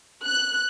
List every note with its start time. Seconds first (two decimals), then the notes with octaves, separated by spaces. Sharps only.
0.25 F#6